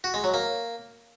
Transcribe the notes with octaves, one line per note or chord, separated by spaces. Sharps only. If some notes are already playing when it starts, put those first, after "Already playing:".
F#4
G#3
F#3
A#3